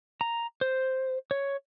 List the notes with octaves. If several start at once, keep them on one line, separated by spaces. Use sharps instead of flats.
A#5
C5
C#5